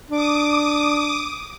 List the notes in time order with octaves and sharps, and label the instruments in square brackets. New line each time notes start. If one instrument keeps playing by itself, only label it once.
[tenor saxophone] D4 [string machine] D6 D#6